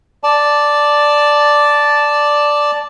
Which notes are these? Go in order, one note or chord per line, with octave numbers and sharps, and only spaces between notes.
D5 A5